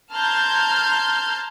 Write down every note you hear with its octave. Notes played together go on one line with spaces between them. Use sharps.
A5 A#5 C6 F6 G6 G#6